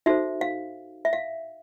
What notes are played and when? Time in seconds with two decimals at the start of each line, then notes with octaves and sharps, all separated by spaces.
0.06 D#4 F#4 A4 C5 E5
0.41 F5
1.05 E5
1.13 F5